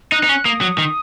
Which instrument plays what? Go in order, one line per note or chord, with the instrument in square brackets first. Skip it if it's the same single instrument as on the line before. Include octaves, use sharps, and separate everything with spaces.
[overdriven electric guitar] D#4 [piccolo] F#6
[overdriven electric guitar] D#4
C#4
[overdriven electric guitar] A#3 [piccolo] D#6
[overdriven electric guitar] F#3
D#3